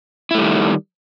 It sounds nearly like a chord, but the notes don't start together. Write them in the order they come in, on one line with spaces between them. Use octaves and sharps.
E4 A3 G3 D#3